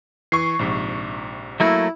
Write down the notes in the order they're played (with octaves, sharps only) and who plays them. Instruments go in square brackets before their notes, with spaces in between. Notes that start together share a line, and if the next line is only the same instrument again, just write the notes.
[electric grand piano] E3 [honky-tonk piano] C#6 C7
[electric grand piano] A#1 G#2 C3
[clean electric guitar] F#3 A3 A#3 [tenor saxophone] E4